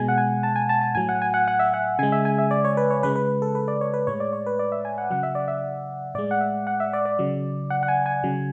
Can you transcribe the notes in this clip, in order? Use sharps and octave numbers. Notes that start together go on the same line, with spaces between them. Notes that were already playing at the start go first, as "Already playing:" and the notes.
Already playing: B2 G#3 G#5
F#5
G#5
A5
G#5
A5
A5
A2 F#3 G#5
F#5
G#5
F#5
F#5
E5
F#5
C#3 G#3 G#5
E5
G#5
E5
D5
C#5
B4
C#5
C#3 G#3 B4
B4
A4
B4
D5
C#5
B4
A2 G#3 C#5
D5
C#5
B4
D5
E5
G#5
F#5
C#3 F#3 F#5
E5
D5
E5
A2 G#3 D5
F#5
E5
F#5
E5
D5
D5
C#3 F#3
F#5
F#5
G#5
G#5
C#3 F#3